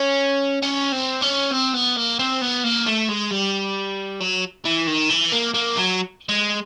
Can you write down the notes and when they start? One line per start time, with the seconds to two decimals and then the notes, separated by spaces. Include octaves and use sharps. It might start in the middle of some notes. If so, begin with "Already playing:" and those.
Already playing: C#4
0.62 C#4
0.92 C4
1.22 C#4
1.52 C4
1.74 B3
1.97 A#3
2.19 C4
2.41 B3
2.64 A#3
2.87 A3
3.09 G#3
3.31 G3
4.20 F#3
4.65 E3
4.87 D#3
5.10 E3
5.33 A#3
5.54 A#3
5.77 F#3
6.29 G#3